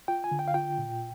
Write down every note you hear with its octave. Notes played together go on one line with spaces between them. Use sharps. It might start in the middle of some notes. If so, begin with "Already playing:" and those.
F4 G5
G#5
D3
G5
F5
F4 G5
A#2